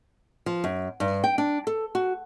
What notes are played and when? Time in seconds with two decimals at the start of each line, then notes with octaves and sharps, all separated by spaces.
0.46 F3
0.64 F#2
1.00 G2
1.24 G5
1.38 D4
1.67 A4
1.95 F#4